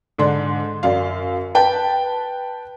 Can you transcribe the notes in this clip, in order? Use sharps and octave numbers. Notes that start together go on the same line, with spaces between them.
G#2 D3 D5 C6
F#2 D5 F5
B4 G5 A5